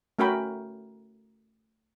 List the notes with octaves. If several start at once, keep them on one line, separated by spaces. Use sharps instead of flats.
A3 C#4 F#4 A#4 G5 B5